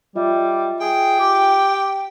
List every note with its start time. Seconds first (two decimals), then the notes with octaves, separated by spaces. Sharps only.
0.15 G3 F4 D#5 E5
0.81 G#4 G5
1.19 G4